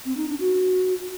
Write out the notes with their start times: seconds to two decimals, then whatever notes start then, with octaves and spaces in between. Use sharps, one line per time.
0.05 C4
0.17 D#4
0.28 D4
0.40 F#4